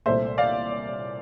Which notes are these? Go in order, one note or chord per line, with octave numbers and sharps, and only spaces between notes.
C2 A#2 A3 C5 E5
D5 F5